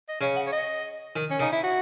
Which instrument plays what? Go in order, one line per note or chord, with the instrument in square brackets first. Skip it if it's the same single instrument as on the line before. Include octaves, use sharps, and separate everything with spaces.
[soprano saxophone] D#5
[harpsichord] C#3 [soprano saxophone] C#5
[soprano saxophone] F#5
C#5
D#5
[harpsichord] D#3
[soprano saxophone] C#4
[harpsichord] C#3 [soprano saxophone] D#4
[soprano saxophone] E4
F#4